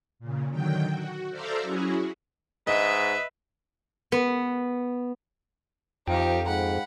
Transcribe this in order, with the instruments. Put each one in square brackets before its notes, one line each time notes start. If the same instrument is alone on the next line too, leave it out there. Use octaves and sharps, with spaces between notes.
[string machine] A#2 C#3
D3 D#3 F#3 G5
F#4
A4 C5 D5 E5 F5 A#5
F#3 C#4 E4 F#4 G#4
[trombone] G#2 [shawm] B4 [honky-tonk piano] D#5 [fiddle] E5
[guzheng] B3
[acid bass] F2 [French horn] F3 [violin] D#4 G4 [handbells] F5 G5
[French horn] G#2 [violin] F#5 B5